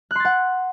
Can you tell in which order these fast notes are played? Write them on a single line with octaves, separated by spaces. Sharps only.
F#6 C6 A6 F#5